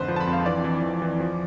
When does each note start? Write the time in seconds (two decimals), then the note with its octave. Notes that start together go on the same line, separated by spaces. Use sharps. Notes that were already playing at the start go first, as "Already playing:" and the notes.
Already playing: F2 G#2 D3 B4 C5
0.08 F3
0.16 A5
0.21 B5
0.27 F2
0.33 F5
0.46 E3 D5
0.64 E3
0.83 E3
1.02 E3
1.20 F3